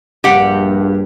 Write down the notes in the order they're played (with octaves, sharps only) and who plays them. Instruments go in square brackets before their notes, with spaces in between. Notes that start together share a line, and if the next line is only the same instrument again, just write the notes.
[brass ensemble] A#1 G2 [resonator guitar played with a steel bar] G4 F#5